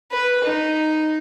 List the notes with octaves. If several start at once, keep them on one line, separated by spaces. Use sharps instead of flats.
B4
D#4